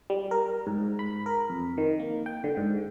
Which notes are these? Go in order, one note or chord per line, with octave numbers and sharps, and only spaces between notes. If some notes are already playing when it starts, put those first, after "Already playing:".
G3
A#4
G#2
B5
A#4
F2
D#3
A#3
G5
D3
G#2